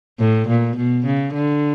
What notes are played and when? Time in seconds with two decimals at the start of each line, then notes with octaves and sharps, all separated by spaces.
0.20 A2
0.49 A#2
0.76 B2
1.05 C#3
1.34 D3